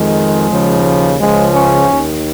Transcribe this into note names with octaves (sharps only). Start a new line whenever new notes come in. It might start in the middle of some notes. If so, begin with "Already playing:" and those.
Already playing: F2 D#3 G#3
D#2 C#3 F3
C#2 C#3 F3 G#3
C#4
D#2 D#3